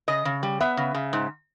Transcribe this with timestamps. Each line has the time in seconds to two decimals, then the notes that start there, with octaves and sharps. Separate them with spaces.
0.08 C#3 D#5
0.25 C#3
0.43 G3
0.61 B3 E5
0.77 C#3
0.94 C#3
1.13 G#2